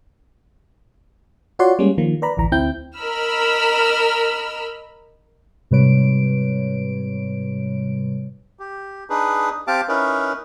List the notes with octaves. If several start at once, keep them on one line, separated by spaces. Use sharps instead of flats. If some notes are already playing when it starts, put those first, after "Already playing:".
F4 F#4 C#5 D5 F#5 C6
G3 G#3 A#3 C#4
D#3 F3 A#3
B4 D5 A#5 B5
A1 D2 E3 A#5
D2 C4 E4 G5 G6
A#4 D#5 B5 E6 F6
G#2 C3 G3 B4 C#5 D7
G4
D4 D#4 G#4 B4
C4 G4 F5 A5 D6
C#4 D#4 E4 A#4 B4